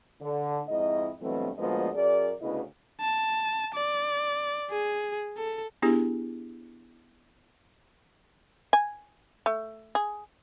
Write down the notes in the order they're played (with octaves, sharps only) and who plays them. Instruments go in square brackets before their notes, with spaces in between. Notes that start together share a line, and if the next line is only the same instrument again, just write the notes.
[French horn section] D3
F2 G#2 E4 D#5
G2 B2 E3 F#3 A3 C4
D2 A#2 F3 G#3 B3 D#5
F#2 G#4 A#4 D5
D2 C#3 B3 E4 B4 D#5
[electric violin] A5
D5
G#4
A4
[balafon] B3 D4 E4 G4 G#4
[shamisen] G#5
A3
G#4